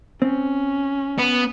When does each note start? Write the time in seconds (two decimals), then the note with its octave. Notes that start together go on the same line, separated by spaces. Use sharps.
0.22 C4 C#4
1.18 B3